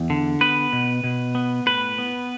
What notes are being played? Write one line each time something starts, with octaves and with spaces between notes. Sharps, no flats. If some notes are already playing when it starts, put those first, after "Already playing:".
Already playing: E2
D3
B3 B4
B2
B2
B3
A2 B4
B3